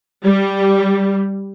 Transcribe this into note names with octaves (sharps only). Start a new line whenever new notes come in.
G3